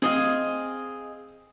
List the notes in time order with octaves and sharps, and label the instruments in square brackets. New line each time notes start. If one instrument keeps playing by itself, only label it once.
[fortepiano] C4 [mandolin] G#4 D#5 F5